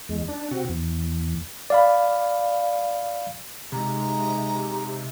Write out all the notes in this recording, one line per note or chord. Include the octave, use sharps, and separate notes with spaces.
E2 G#3
D4
C3 C4 F#4
E2
D5 F5 B5
C3 G#3 D#4 A#5